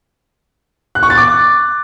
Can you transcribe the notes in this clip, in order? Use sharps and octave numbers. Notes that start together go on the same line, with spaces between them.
F#6
C#6
A6
D6